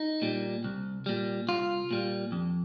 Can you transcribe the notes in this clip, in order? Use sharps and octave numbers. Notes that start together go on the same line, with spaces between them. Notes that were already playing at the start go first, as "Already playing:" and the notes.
Already playing: D#4
A#2 G3
C2
A#2 G3
C2 F4
A#2 G3
F2